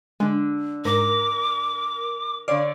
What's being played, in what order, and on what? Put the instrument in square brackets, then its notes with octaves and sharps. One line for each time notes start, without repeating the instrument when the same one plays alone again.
[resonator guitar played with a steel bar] D3 D4 [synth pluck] G#3
[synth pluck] G#2 [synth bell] A#4 [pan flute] D6
[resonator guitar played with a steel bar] D3 C#5 [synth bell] D5 [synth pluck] F5